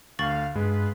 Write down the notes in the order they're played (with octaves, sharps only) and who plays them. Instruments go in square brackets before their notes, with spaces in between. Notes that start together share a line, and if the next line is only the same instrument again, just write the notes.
[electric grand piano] D2 [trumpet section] F5 [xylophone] C#6 A6 F#7
[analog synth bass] G2 [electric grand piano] G#3 [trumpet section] B3 F4 B4